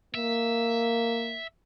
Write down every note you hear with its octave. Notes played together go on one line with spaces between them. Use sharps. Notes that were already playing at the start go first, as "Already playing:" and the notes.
A#3 E5